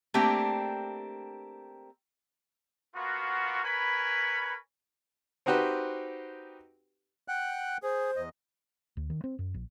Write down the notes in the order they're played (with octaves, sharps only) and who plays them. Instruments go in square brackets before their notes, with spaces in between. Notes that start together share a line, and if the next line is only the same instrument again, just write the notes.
[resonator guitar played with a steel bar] A3 A#3 C4 D4 G4
[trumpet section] A#3 B3 F4 F#4
A#4 B4 C#5 G#5 B5
[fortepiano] C4 D#4 F#4 G4 B4 C5
[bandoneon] F#5 G5 F#6
[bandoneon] G#4 [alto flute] C5
[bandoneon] E2 D#5
[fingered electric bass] D2
D#3
C4
F#2
A#1